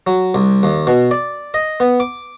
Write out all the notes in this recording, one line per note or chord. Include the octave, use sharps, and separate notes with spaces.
F#3
C2
D#2
B2
D5
D#5
B3
D6